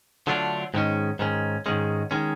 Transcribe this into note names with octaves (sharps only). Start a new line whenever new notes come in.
D3 F#3 A3 D4 F4
G#2 D#3 G#3 C#4
G#2 D#3 G#3 C#4
G#2 D#3 G#3 C#4
D#3 G#3 C#4